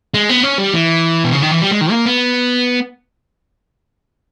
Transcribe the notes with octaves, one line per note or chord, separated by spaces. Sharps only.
G#3
B3
C#4
G3
E3
B2
C#3
D#3
E3
G3
G#3
D#3
A#3
B3